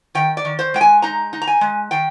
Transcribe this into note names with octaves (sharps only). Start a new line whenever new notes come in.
D#3 G5
D5
D#3
C5
G#3 G5
G#5
D#4 A#5
D#4
A#5
G#5
G#3
D#3 G5